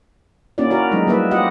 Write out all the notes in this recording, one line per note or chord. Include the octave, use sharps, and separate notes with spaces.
A#3 C#4 D#4 E4 F#4 D5
E4 F#4 A#4 D5
F3 F#3 G#3 A3 D#4
G3 A#3 E4 A#4 B4 E5
F4 G4 D#5 F#5